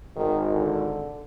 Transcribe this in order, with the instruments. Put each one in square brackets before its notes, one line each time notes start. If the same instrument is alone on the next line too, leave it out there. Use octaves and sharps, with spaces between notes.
[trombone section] G#1 [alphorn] D#3
[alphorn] D3